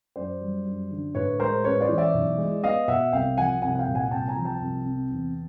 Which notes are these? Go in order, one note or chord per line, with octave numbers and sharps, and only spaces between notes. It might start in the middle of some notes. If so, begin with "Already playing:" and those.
F#2 C5 D5
G3
F#2
D3
A2 B4 C#5
G#3 A#4 C5
C#4 B4 C#5
C5 D5
E3
D5 E5
B1
G#3
B3 D#5 F5
B2 E5 F#5
C2 F5 G5
F3 F#5 G#5
C2 F#5 G#5
F#5
F5 G5
A#2
F#5 G#5
C2 G5 A5
G#5 A#5
F3
G5 A5
C2
C3
E2